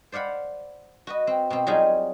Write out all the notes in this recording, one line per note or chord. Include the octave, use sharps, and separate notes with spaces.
C5 D5 F5 F#5 B5
F#4 B4 D#5
C4
B2 C4
F#3 G3 C4 D#4 F4 G#4